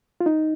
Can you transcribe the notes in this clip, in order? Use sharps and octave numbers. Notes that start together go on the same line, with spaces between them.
F4
D#4